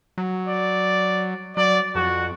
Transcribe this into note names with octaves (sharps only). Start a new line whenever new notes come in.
F#3
D5
F#3 D5
F2 F#4